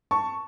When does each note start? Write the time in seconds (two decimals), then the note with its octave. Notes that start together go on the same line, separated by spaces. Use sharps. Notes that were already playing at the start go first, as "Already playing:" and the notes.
0.11 A5 C#6